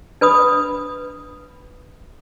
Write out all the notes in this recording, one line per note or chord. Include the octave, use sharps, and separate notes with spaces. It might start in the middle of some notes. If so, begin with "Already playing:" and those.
D4 B4 B5 D#6